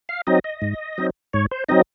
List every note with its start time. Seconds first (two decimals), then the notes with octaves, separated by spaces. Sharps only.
0.09 F5
0.27 F#3 C4 D#4 D#5
0.44 D#5
0.62 G#2
0.98 F#3 C4 D#4
1.33 G#2 C#5
1.52 C5
1.69 F#3 C4 D#4 D#5